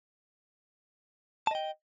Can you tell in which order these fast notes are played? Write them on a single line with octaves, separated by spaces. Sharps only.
A5 D#5 G5